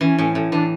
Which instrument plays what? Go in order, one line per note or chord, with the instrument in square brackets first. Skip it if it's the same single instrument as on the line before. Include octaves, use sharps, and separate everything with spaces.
[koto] E3 [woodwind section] C#4
[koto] A2 [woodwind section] C#4
[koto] A2 [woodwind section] C#4
[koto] E3 [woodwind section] D4